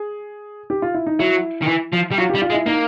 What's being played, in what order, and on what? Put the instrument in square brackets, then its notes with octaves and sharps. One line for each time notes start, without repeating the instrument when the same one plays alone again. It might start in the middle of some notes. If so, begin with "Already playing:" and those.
Already playing: [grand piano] G#4
G4
F4
E4
D#4
[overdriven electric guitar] F#3 [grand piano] E4
[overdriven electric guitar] D#3
E3
F3
G3
[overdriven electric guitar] F#3 [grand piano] F4
[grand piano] G4
[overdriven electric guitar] G3
[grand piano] F4
[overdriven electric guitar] G#3
[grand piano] E4
[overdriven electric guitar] A#3 [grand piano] D#4